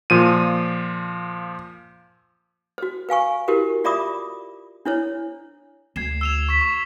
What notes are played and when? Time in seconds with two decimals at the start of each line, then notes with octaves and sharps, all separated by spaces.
0.10 A#2 F3 D#7
2.78 F#4 C5
3.09 B4 F5 G#5 C#6
3.48 E4 F#4 G4 A#4 B4
3.84 F4 D5 E5 B5 D6 D#6
4.85 D4 E4 C5 C#5
5.96 D2 G#6 C7 E7
6.21 E6 E7 F7
6.49 C#6 B6 E7
6.61 C#6